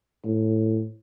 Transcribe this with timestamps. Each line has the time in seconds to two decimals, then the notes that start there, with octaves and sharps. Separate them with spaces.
0.25 A2